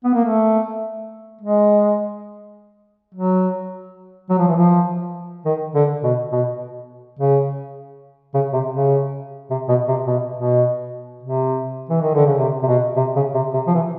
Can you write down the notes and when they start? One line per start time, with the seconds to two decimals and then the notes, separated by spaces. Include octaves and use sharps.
0.05 B3
0.14 A#3
0.25 A3
1.41 G#3
3.15 F#3
4.29 F#3
4.38 F3
4.48 E3
4.56 F3
5.45 D#3
5.75 D3
6.03 B2
6.32 B2
7.19 C#3
8.34 C#3
8.53 C3
8.73 C#3
9.50 C3
9.69 B2
9.88 C3
10.07 B2
10.37 B2
11.23 C3
11.89 E3
12.01 D#3
12.14 D3
12.27 C#3
12.38 C3
12.63 C3
12.68 B2
12.96 C3
13.16 C#3
13.34 C3
13.54 C3
13.67 F3
13.74 E3